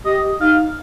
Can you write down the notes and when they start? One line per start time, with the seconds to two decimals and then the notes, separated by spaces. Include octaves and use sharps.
0.05 G4 D#5
0.40 D#4 F5